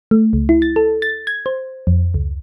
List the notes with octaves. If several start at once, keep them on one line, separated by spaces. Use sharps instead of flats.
A3
C#2
E4
A6
A4
A6
G#6
C5
F2
C#2